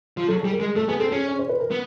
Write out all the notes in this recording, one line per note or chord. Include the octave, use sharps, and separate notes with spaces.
F3
F#3 A4
G#4
G3
A#4
G#3
A3 A4
B3 G#4
C4 A4
C#4 G#4
C#5
C5
B4
A#4
B3